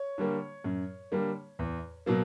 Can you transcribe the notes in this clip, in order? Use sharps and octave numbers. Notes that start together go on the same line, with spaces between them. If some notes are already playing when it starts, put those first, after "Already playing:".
Already playing: C#5
D3 G3 A#3
F#2
D3 G3 A#3
E2
B2 F#3 A#3